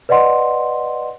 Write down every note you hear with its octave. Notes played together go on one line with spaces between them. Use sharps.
B4 D5 D#5 F#5 C6